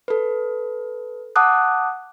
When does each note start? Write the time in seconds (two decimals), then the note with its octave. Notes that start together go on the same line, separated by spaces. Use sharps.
0.08 A4 B4
1.36 F#5 A5 D6 D#6 F#6